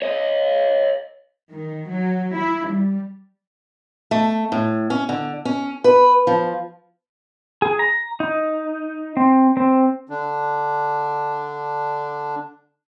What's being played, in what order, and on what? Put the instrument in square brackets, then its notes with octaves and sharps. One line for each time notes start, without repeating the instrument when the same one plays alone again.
[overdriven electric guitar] C#5 D#5
[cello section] D#3
F#3
E4
G3
[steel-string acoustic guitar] A3
A2
C#4
D3
C#4
B4
F3
[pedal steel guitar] G#4
A#5
D#4
C4
C4
[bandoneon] D3 D4